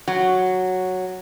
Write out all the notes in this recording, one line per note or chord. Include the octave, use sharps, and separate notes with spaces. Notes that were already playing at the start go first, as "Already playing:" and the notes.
F#3